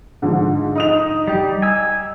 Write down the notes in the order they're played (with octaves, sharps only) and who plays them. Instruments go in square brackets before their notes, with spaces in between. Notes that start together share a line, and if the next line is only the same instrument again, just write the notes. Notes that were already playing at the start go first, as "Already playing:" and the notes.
[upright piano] G#2 D3 F3
D#4 D#6 F7
[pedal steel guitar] G3 G4
G#5 E6